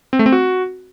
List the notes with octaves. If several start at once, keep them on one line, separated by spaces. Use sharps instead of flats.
C4
A3
C4
F#4